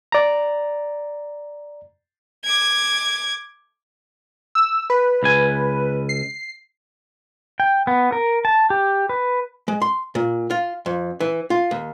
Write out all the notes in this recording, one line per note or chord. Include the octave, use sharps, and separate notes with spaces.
D5 A#5
D6 G#6
E6
B4
C#2 G#5
C7
G5
B3
A#4
A5
G4
B4
G#3
C6
A#2
F4
F2
E3
F4
D#2